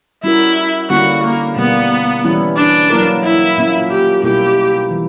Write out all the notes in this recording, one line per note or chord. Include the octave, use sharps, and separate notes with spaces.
G3 C#4 E4 F#4 A#4
D3 G3 A#3 C#4 E4 F#4
A#3
B2 G3 A#3 B3
E3 G3 C#4 E4
D4
F#3 A#3 E4 A#4
E4
A#2 A#3 C#4
G4
B2 G3 A#3 E4 G4
E3 G3